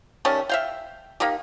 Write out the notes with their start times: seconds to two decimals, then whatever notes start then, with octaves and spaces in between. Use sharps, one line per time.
0.25 D#3 G3 A3 C#4
0.49 E5 F5 G5
1.20 A#3 D#4 G4